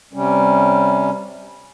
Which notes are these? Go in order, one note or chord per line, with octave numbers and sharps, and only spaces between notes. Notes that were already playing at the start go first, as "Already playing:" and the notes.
C3 G3 C#4